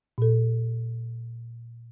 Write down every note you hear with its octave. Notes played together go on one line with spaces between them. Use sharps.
A#2 A4